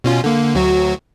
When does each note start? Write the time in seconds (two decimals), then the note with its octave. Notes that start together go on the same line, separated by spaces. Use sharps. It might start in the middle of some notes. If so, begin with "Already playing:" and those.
0.04 B2 C#4 F4
0.24 D3 A#3
0.55 D2 F#3 F#4